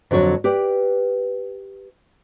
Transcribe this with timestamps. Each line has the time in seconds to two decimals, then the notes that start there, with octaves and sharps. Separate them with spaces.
0.11 F2 D3 F#3 C#5
0.44 G4 B4 D5